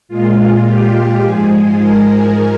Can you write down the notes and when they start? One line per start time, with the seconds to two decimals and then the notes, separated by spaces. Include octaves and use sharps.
0.08 A#2 G#3 F4
0.67 G4
1.23 G#2 F3 G#3 G#4
1.81 A#4